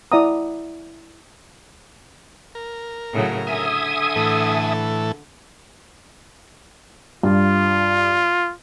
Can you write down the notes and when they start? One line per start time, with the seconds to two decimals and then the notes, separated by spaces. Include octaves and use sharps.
0.12 E4 D5 E5 F#5 A#5 D#6
2.55 A#4
3.13 A2 C#3 F#3
3.47 D3 E5 G#5 D#6
4.16 A2 E3 A4
7.23 G2 F4